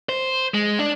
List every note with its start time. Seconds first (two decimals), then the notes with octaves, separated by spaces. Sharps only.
0.09 C5
0.54 G#3
0.79 D4